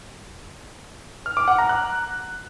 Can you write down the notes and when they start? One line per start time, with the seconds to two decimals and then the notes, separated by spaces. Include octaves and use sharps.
1.26 F6
1.37 D6
1.48 F#5
1.58 A#5
1.69 F#6